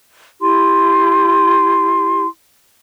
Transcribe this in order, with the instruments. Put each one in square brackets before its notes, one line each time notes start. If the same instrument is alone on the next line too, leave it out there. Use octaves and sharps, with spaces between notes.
[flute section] E4 G4 C6